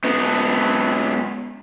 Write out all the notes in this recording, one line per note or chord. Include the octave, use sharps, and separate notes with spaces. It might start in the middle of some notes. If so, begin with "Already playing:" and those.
G#2 B3